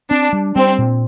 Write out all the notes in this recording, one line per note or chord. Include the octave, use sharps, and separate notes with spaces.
C4 D4
G3
G3 C4
A#2